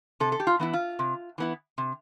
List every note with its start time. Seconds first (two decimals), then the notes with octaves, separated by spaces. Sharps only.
0.20 C3 A4
0.32 A4
0.40 G4
0.47 F4
0.60 E3 B3 E4
0.73 F4
0.99 C3
1.38 E3 B3 E4
1.78 C3